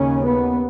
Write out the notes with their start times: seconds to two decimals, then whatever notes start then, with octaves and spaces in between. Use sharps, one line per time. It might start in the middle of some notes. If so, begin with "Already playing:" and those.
Already playing: D#2 C#3 C#4
0.23 B3